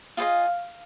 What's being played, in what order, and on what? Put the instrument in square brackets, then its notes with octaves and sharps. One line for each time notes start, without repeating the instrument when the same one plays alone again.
[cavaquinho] F4 G#4 C5 D#5 F5